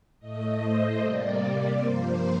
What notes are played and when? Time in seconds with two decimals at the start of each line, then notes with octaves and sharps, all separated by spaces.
0.19 A2 A3 D#5
0.60 C5
1.01 C3 G3 A#3 D5
1.82 G2 F3 A#3 C5